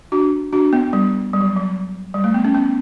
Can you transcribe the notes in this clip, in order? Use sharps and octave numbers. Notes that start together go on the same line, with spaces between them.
D4 F#4
D4 F#4
B3
G3
G3
F#3
F#3
G3
A3
B3
C#4
B3